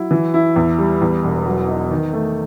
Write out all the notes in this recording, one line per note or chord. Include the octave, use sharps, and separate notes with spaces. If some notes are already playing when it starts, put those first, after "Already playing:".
Already playing: F#3 E4
E3
E4
E2
G3
E2
E1
F#3
D#4
D#3
A3